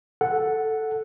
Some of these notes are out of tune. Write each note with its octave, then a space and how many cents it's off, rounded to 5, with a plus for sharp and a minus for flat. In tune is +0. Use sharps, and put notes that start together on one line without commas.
A4 +0 F#5 +0